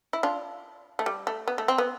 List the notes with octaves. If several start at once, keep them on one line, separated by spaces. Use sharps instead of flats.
E4
D4 F4
A3
G3
A3
B3
A3
C4
B3